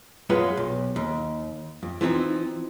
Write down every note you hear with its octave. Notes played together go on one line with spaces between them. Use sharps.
F#2 G#3 F4 B4 F#5
B1
D#2
F2
E3 F3 C4 D4 D#4